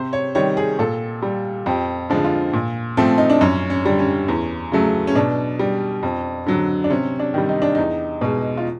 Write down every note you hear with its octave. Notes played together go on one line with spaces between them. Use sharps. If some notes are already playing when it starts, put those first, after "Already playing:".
Already playing: C3 C5
C#5
D#3 G3 C#5
G#4
A#2 A4
G3
F2 G4
D3 F3 G#3
F4
A#2
F3 A3 C4
D#4
D4
F#2 C#4
C#4
D3 G3
C#4
E2
C#3 F#3 A3
C#4
B2 D4
G3
F2
D3 F#3
D4
C3 C#4
D4
D#3 G3
D#4
D4
E2 D#4
B2 G#3
F4